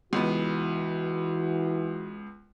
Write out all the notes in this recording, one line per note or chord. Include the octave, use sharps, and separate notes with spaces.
C#2 E3 B3 F#4